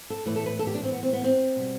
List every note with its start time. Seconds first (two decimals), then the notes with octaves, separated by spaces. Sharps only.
0.10 A4
0.26 A2 E3 A3 B4
0.36 A4
0.46 B4
0.59 A4
0.67 G4
0.75 D4
0.83 C4
0.92 B3
1.03 C4
1.13 B3
1.24 C4
1.56 B2 G3